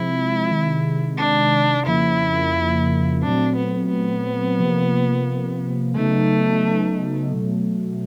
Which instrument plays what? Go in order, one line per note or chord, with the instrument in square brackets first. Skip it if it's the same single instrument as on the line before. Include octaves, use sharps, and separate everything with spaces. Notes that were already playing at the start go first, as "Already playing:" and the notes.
Already playing: [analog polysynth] C3 F3 G#3 C4 [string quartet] E4
[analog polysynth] C3 D#3 G#3
[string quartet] D4
[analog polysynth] F2 C#3 F3 A#3 [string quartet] E4
[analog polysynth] A#2 F#3 A3 C4 [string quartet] D4
[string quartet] B3
B3
[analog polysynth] C3 F3 A#3
[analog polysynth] C#3 F#3 B3 D#4 [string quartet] A3
[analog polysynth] B2 F#3 A3